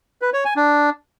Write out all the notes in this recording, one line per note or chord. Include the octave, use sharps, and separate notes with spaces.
B4
C#5
G#5
D4